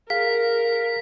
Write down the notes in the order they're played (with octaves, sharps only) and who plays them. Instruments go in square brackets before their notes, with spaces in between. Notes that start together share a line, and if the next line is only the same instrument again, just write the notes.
[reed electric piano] G#4 F5 [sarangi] A#4 [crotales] B6